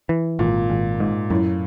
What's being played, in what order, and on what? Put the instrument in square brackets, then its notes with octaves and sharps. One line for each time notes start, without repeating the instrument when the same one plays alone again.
[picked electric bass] E3
[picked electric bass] G#1 [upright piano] A#2
[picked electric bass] G#1
G#2
[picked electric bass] F#2 [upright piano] A2